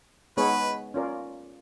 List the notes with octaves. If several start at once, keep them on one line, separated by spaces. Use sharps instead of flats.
G#3 B3 D#4 G#4 B4 C#5
C#4 F4 A#4 D5